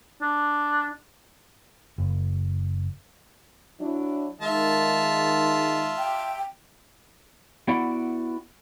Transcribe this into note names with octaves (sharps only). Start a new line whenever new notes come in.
D4
F#1
F#3 D4 E4
D#3 G#3 F4 E5 A5
G5
B3 E4 F#4 D5 F#5 G5